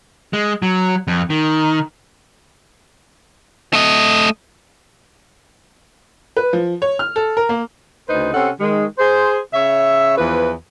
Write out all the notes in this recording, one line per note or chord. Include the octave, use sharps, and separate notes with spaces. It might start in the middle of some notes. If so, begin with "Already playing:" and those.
G#3
F#3
F2
D#3
A3 D#5
B4
F3
C#5
F6
A4
A#4
A#3
D2 C#3 D#4 B4 C5
C3 C4 C#4 A4 F#5
D#3 G#3
G#4 C5
C#3 C#5 E5
E2 E3 F3 B4